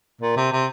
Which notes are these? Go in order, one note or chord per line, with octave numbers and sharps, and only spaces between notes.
A#2
C3
C3